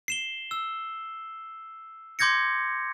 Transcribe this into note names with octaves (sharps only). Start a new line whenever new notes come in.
C7 E7 G7
E6
C6 D6 G6 G#6 A#6 C#7